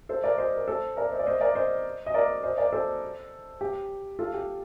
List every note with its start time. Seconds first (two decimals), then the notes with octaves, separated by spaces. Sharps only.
0.09 A4 C5
0.24 A#4 D5
0.38 C5 D#5
0.56 A#4
0.68 A4 C5
0.97 A#4 D5
1.12 C5 D#5
1.19 D5
1.26 C5 D#5
1.41 A#4 D5
1.55 C5 D#5
2.06 D#5
2.14 A#4 D5
2.44 C5 D#5
2.58 A#4 D5
2.73 A4 C5
3.61 G4
4.19 F4 A4
4.34 G4